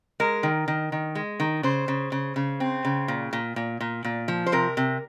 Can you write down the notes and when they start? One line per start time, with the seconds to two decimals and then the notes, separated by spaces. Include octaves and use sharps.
0.20 G#3 A#4
0.43 D#3
0.68 D#3
0.92 D#3
1.15 G#3
1.40 D#3
1.63 C#3 C5
1.88 C#3
2.12 C#3
2.36 C#3
2.60 C4
2.85 C#3
3.08 A#2
3.33 A#2
3.56 A#2
3.81 A#2
4.04 A#2
4.28 F3
4.47 C5
4.52 C3 A#4
4.77 C3